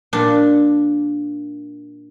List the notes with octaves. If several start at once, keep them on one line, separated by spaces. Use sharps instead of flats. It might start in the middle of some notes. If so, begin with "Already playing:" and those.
A#2 D4